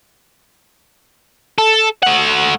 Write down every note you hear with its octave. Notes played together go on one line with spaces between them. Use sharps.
A4
A3 F#5